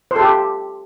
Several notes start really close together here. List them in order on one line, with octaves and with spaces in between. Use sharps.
C5 A4 G4